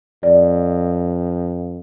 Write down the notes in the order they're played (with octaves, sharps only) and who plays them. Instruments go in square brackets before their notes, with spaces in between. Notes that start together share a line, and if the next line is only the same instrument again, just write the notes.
[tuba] F2 [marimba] D5